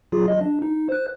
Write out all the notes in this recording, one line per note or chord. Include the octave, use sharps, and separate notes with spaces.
F#3 F4 G#4
F#3 D#5
D4
D#4
C5 F#6